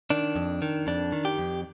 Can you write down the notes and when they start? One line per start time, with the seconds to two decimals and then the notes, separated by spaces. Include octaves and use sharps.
0.10 D#3 D4
0.36 F2
0.62 D#3
0.87 F2 D4
1.12 D#3
1.25 G4
1.38 F2